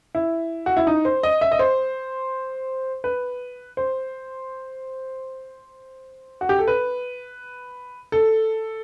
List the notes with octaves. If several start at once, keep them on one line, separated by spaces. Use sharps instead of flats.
E4
F#4
E4
D#4
C5
D#5
E5
D#5
C5
B4
C5
F#4
G4
A4
B4
A4